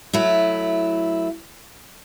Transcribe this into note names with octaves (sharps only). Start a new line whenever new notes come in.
F#3 A3 E4